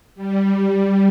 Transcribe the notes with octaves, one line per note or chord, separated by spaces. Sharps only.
G3